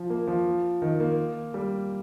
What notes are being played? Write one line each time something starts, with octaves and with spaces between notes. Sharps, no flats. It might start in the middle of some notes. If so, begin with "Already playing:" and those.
Already playing: F3
A#3
F3
D#3
A#3
G3